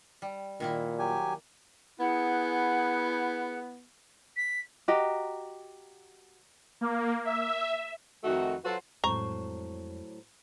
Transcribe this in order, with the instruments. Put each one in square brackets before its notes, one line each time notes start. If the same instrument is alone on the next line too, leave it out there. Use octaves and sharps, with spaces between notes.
[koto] G3
[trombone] A#2 [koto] D#3 A#3 E4
[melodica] F#3 G4 G#5
[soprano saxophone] B3 [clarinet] E4 [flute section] G#4 F#5 F#6
[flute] B6
[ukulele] F#4 G4 D#5 A#5
[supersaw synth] A#3
E5
[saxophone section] F2 D#3 A3 D#4 F#4
F#3 F4 F#4 A4 B4 C5
[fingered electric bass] F2 G#3 C4 [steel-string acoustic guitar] A2 F#3 C5 [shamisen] A#5 [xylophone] C#6